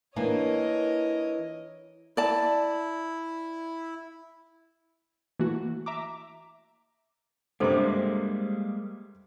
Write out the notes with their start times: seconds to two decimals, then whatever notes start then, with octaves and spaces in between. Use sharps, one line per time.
0.16 E3 A#3 D4 A#4 C#5 D#5
2.17 E4 D5 A5
5.39 E3 A3 A#3 F#4
5.86 E5 A#5 D6
7.60 G2 C3 G3 G#3 A#3 A4 C5 D6